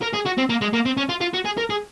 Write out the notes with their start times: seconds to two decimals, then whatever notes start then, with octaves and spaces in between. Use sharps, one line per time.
0.01 A#4
0.13 G#4
0.25 F#4
0.38 C4
0.49 A#3
0.61 G#3
0.73 A#3
0.85 C4
0.97 C#4
1.09 F4
1.21 F4
1.34 F#4
1.45 G#4
1.58 A#4
1.70 G#4